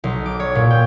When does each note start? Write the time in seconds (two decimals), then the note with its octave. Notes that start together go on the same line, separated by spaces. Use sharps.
0.04 B1
0.26 D6
0.40 C#5
0.55 A#2
0.71 G5